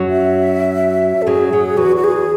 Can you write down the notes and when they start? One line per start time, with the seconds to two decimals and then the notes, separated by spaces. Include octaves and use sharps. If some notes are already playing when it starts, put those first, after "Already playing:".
Already playing: F#2 F#3
0.08 E5
1.22 A4
1.27 F#2 F#3 G#4
1.52 F#2 F#3
1.77 E2 E3 F#4
1.96 F#4
2.04 G#4